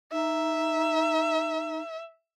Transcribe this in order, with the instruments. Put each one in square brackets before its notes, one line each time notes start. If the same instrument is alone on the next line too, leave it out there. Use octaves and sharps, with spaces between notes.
[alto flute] D#4 [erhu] E5